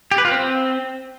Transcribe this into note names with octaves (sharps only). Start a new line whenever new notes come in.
G4
B4
F4
C4